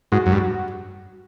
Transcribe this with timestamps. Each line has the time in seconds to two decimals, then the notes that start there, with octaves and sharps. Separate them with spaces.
0.12 G#2 F#4
0.26 F#2
0.32 G2